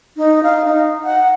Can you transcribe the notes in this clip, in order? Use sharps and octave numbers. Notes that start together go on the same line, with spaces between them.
D#4
F5
D#4
F#5